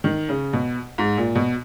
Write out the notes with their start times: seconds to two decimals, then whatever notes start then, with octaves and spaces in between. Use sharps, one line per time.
0.04 D#3
0.29 C#3
0.53 B2
0.98 G#2
1.17 A#2
1.36 B2